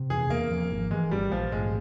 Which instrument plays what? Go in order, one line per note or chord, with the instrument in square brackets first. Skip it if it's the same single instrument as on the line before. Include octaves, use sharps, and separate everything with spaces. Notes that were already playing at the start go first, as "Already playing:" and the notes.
Already playing: [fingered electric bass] C3
[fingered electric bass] E2 [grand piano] G#4
[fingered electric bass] E2 [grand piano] A#3
[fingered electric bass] F3
G#1
[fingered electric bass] E3 [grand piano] G#3
[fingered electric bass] G#1 [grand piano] G3
[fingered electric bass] A#1 [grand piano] F3
[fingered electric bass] G#2 [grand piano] G#3